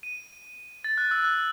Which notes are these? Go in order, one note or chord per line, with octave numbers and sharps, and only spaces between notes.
D#7
A6
F#6
E6
F#6